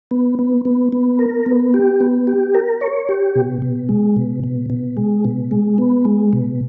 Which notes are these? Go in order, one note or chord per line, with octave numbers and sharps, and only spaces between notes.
B3
B3
B3
B3
A#4
B3
G4
B3
G4
A#4
C#5
G4
B2
B2
G#3
B2
B2
B2
G#3
B2
G#3
B3
G#3
B2